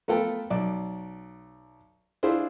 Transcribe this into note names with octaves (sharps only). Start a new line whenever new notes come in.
A3 B3 F4 A4 A#4 G5
B1 D5
D4 E4 F4 G#4 C5